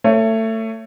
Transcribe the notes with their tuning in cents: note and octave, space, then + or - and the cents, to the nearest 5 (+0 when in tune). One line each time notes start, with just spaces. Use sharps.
A3 +25 C#5 +0